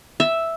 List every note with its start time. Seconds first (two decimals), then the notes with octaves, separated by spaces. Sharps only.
0.20 E5